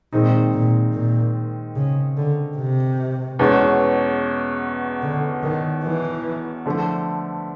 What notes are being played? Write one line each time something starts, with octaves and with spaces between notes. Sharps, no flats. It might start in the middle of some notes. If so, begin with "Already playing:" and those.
A#2 D#3 G#3 C4 D#4
A#2
A#2
C#3
D3
C3
E2 B2 G#3 C#4
D3
D#3
E3
D3 F3 A3